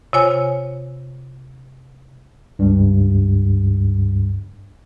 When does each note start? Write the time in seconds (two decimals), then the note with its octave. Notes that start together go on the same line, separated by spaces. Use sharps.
0.13 C3 F4 C#5 G#5
2.59 C#2 G2